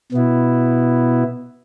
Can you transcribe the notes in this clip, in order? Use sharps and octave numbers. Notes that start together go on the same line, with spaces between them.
B2 B3 E4